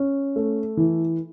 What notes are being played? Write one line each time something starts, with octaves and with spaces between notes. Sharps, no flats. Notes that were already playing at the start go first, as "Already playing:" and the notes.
Already playing: C#4
A3
E3